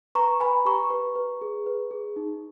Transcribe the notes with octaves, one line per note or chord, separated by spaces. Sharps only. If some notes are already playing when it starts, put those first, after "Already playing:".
B4 A#5 C#6
B4 G#5 B5
G4 A#5 C#6
B4
B4
G#4
B4
G#4
D#4